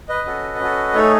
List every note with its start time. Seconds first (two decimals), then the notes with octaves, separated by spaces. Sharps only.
0.09 B4 D#5
0.26 C#4 F#4 A4
0.60 C#4 F#4 A4
0.94 A3 D#4 G#4 A4 C#5